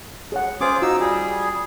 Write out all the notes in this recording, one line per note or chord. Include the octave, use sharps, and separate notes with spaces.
G#4 C#5 F#5
C#4 F4 G#4 C5 D6
D#4 F4 F#4 E6
G3 G#4